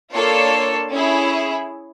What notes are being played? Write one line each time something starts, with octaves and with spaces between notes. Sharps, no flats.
A#3 D4 F4 A4 C#5
C#4 E4 G#4